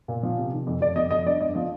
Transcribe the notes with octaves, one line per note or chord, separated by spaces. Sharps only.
A#2
F3
C3
D#3
F2
F2 D5
F2 D#5
F2 D#5
G2 D5
G2 D#5
F3 D#5